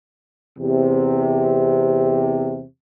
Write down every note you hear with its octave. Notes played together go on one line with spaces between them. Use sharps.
E2 C3